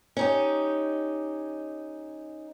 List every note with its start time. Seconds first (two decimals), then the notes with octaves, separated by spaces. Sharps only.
0.17 C#4 D#4 G4